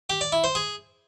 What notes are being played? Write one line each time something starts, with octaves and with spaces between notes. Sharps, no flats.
G4
D5
E4
C5
G#4